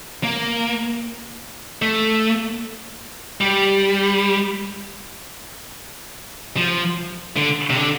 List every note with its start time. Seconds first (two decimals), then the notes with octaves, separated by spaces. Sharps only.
0.23 A#3
1.82 A3
3.41 G3
6.57 F3
7.37 D3
7.70 C3
7.76 D3